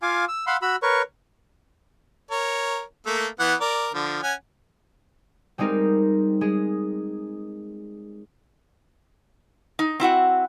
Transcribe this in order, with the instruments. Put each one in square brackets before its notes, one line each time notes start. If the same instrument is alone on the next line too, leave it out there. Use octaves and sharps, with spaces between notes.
[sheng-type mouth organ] F4 F5 G#5 D6
E6
F5 F#5 B5 C6 E6
F#4 B5 E6
A#4 B4 C#5 C#6
[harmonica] A#4 C#5
A3 A#3 A4
E3 B3 F#5
A#4 D5
D3 F3
C#4 F#5 G#5
[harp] G3 G#3 C4 D#4 G4 A#4
G#3 G#4
[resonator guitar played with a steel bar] D#4
C4 E4 F#4 F#5